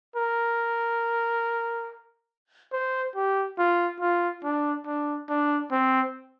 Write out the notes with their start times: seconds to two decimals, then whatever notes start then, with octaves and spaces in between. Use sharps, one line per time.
0.16 A#4
2.73 C5
3.16 G4
3.59 F4
4.01 F4
4.43 D4
4.87 D4
5.29 D4
5.71 C4